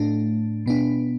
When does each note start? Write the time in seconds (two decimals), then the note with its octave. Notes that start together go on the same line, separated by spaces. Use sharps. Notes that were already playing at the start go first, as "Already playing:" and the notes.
Already playing: A2 A3 D4
0.66 B2 B3 D4